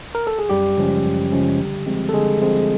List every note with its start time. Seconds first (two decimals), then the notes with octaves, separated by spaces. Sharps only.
0.15 A#4
0.27 A4
0.39 G#4
0.49 F#2 G3 G4
0.77 C#3 F3 G#3 C#4
1.04 F#2
1.32 C#3 F3 G#3 C#4
1.60 D3
1.86 F3 G#3 C4
2.09 A4
2.13 D3 G#3 G#4
2.42 F3 G#3 C4